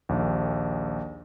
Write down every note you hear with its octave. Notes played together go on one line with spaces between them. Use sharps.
A#1 D#2